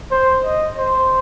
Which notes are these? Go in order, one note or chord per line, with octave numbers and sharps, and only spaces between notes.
C5
D#5
C5